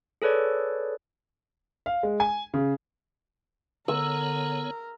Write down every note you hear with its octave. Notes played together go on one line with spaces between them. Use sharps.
G#4 A4 B4 C#5 D5
F5
G#3
G#5
C#3
D3 B3 A#4 C#5 E6